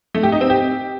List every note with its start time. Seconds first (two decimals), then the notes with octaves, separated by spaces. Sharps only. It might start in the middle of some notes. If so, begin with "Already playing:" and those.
0.15 A3
0.23 G4
0.32 D#4
0.41 C4
0.50 G4